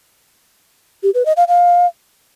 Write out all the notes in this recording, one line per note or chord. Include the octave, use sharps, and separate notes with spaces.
G4
B4
D#5
F5
F5